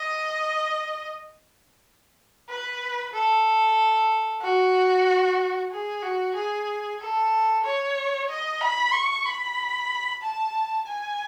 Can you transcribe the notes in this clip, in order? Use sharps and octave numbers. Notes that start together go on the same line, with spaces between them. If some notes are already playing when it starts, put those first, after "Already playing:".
Already playing: D#5
B4
A4
F#4
G#4
F#4
G#4
A4
C#5
D#5
B5
C#6
B5
A5
G#5